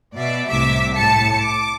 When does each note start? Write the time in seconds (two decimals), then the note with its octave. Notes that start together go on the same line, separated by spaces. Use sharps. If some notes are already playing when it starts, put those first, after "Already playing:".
0.15 B2 D5 E5
0.50 C2 A2 C3 E5 D6 B6
0.95 A2 A5 C#7
1.43 D6